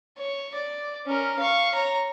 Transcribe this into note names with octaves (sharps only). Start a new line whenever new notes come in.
C#5
D5
C#4 A#4
F5 C#6
C#5 A#5